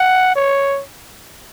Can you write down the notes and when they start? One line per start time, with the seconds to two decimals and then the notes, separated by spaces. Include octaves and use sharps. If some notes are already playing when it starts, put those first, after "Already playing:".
Already playing: F#5
0.36 C#5